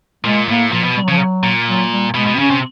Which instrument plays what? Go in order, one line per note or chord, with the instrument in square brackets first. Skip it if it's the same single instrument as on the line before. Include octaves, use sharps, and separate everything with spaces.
[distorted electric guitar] A#2 [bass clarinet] G#3
[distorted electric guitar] A2 [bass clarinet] A#3
[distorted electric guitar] A#2 [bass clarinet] F3
[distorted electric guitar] B2
[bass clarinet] G3
F#3
[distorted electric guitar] C#3 [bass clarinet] F3
[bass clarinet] F#3
[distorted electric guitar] A#2
[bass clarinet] F#3
G3
[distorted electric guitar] B2 [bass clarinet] G#3
[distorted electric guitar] B2
[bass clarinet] C4
[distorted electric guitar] C#3 [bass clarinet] C#4
[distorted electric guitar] C3